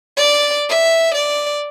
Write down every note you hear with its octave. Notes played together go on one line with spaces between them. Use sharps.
D5 A6
E5
D5